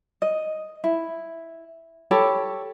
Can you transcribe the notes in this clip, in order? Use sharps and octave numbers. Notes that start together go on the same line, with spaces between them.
D#5
E4
G4 A4 C#5 B5